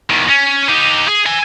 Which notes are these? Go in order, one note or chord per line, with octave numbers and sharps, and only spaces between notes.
E2 D#3
C#4
D#4 G4
G#4
E5 G#5